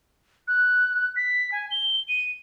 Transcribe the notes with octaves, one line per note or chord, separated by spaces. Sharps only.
F#6
B6
G#5
G7
D#7